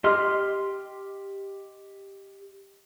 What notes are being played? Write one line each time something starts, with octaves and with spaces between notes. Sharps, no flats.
G4 D#5 C6 F6